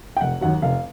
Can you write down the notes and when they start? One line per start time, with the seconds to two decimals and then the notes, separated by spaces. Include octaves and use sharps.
0.17 G5
0.21 F1 F#5
0.41 D#2 D#3 F#3 F#5
0.62 F1 F5